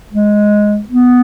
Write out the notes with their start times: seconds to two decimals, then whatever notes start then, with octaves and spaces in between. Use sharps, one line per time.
0.13 G#3
0.88 B3